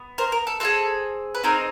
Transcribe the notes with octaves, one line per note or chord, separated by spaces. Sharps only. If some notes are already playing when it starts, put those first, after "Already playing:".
Already playing: B3
A#4 C5
A#4
A4
C4 F4 G#4 A4
B4
C4 D#4 G#4 A#4